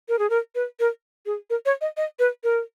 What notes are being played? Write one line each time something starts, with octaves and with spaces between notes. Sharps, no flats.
A#4
G#4
A#4
B4
A#4
G#4
A#4
C#5
D#5
D#5
B4
A#4